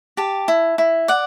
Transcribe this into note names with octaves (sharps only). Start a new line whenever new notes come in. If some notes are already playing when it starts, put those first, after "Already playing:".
G4 A5
E4
E4
D5 F#5